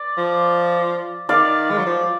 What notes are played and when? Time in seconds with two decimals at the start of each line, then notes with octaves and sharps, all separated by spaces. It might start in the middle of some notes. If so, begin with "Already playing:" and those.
Already playing: D5
0.18 F3
1.29 D#3 D5 F5
1.70 G#3
1.78 F#3
1.86 F3